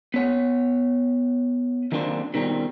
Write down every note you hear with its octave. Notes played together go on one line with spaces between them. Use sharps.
B3 C#5 F#5
D#3 F#3 A#3 C4 D4 C5
B2 D#3 G3 C4